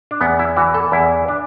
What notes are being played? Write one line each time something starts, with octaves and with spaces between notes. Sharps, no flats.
D4
E2 B3
E4
E3 F#4
A4
E2 E4
D4